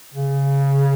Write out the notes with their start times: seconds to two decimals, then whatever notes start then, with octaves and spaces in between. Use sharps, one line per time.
0.14 C#3